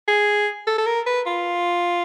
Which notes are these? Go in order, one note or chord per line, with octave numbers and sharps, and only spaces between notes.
G#4
A4
A4
A#4
B4
F4